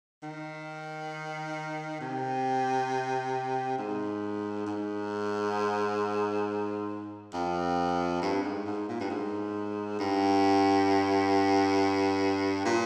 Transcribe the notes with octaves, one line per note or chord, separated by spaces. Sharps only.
D#3
C3
G#2
G#2
F2
G2
G#2
G#2
A#2
G2
G#2
G2
A#2